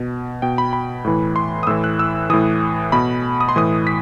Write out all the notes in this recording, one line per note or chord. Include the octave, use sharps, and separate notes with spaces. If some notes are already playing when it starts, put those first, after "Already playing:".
Already playing: B2
B2 G5
B5
B5
A2 E3
C6
D#6
A2 E3 E6
F#6
E6
A2 E3 D#6
B2 B5
D#6
C6
A2 E3 D#6
B6